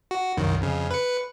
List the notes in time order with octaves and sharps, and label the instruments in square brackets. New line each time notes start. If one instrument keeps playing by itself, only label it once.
[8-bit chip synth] F#4
C2 F#2 D#3
F2 C#3
B4 C#7